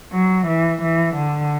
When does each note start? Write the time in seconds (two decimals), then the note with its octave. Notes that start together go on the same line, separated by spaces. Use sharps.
0.12 F#3
0.47 E3
0.81 E3
1.15 D3